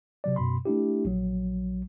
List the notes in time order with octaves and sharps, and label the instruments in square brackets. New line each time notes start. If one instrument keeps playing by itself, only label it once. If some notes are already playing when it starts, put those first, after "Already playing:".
[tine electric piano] C3 F#3 D5
F#2 B2 B5 C6
A3 D4 E4 G4
A#1 F#3